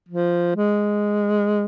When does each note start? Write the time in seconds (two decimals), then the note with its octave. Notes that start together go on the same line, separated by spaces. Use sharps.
0.09 F3
0.56 G#3